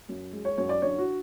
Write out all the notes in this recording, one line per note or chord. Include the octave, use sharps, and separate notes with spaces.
F#2
G#3
C#5
F#2 C#5
D5
D3 C#5
F#4